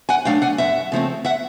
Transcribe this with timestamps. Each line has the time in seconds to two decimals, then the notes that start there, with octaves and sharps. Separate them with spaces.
0.09 F#5 G#5
0.25 F#3 A3 D4 F5 G5
0.42 F#5 G#5
0.58 F#2 E5 F#5
0.92 C#3 F3 A3 C4
1.25 E5 F#5